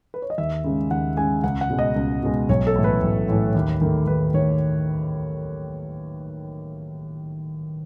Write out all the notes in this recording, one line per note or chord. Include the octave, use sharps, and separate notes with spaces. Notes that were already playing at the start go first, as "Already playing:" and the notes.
B4
C#5
D#5
D#2 E5
C#3 G#3
D#2 F#5
C#3 G#3 G#5
C#2 F#5
F#5
B2 G#3
D#5
C#2
B2 G#3
B1 C#5
A4
A2 E3 A3
B4
B1
A2 E3 A3
D#2
D#3 A3
D#2 B4
D#3 A3 C#5